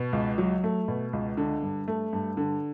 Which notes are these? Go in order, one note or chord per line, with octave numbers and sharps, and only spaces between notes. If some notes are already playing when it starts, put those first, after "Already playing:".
Already playing: B2
C#2
F#3
A3
B2
C#2
D3
G2
A3
G2
D3